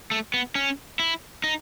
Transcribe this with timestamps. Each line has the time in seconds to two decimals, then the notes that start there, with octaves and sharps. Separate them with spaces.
0.11 A3
0.34 B3
0.55 C#4
0.99 E4
1.44 D#4